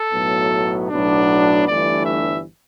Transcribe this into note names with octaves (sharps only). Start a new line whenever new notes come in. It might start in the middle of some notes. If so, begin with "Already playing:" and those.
Already playing: A4
B1 A2 F#3 B3
B1 A2 F#3 B3 D4
G1 G2 E3 A3 D4 D5
E5